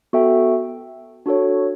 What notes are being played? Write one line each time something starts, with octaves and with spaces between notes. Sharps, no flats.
B3 F#4 A4 E5 G5
D4 F#4 A4 C#5